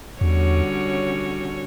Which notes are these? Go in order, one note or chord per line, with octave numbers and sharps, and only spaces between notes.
E2 D3 G3 C#4 F#4 C#5